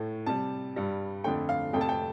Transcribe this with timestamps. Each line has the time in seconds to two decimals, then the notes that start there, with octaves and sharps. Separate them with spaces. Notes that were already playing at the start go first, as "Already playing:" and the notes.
Already playing: A2 A3
0.26 C3 G3 A5
0.76 G2 G3
1.24 F2 D3 A3 G5
1.49 F5
1.73 F2 C3 A3 G5
1.81 A5
1.89 G5